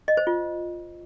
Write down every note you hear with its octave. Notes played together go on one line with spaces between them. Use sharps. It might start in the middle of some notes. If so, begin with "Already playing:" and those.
D#5
C5
F4